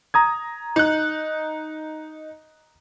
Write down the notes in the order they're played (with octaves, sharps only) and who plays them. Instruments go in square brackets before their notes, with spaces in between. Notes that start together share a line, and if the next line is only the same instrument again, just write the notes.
[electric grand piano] A#5 D#6 G#6
[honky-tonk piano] D#4 F#6